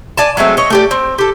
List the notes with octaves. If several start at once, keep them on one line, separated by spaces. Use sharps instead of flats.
D5 G#5 A5
F#3 G#3 A3 C4
C#5 D#5
A3 G4 D5
C4
G4 A4